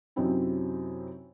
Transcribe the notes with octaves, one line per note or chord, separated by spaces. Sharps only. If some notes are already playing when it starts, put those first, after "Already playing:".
F#2 C3 F#3 C4 D#4 E4